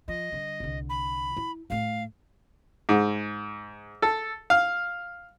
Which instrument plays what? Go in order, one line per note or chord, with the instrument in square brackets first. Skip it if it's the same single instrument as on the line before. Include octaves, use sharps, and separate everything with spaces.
[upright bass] F3 [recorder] D#5
[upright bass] D3 G3
C2 D3
[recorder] B5
[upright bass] E4
[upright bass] A2 A3 [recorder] F5
[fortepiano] G#2
A4
F5